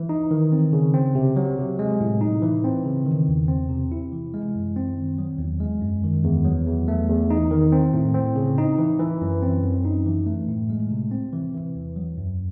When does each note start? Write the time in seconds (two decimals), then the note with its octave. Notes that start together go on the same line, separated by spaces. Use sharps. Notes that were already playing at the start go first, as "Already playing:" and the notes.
Already playing: E3
0.09 D#4
0.31 D#3
0.52 C4
0.73 C#3
0.94 C4
1.15 C3
1.36 F#3
1.58 C3
1.79 G#3
2.01 A2
2.21 D#4
2.42 E3
2.64 C4
2.85 C#3
3.06 D#3
3.28 E2
3.48 C4
3.69 C3
3.92 E4
4.12 E3
4.34 G#3
4.55 F#2
4.76 C4
4.96 D#3
5.18 F#3
5.39 E2
5.60 G#3
5.81 F#2
6.04 D#3
6.24 E2
6.45 F#3
6.67 E2
6.88 A3
7.09 E2
7.30 D#4
7.51 D#3
7.72 C4
7.93 A2
8.14 C4
8.36 C#3
8.58 D#4
8.78 E3
9.00 E3
9.21 F#2
9.42 C4
9.63 F#2
9.85 D#4
10.06 E3
10.26 A3
10.48 A2
10.70 G#3
10.91 C3
11.12 C4
11.33 E3
11.54 E3
11.75 E2
11.96 F#3
12.18 F#2